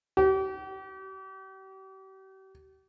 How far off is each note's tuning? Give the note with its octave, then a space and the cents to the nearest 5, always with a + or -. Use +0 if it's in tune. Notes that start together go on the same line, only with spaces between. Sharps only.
G4 -40